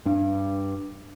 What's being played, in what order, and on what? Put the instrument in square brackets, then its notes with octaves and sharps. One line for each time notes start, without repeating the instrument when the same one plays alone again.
[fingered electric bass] G2 D4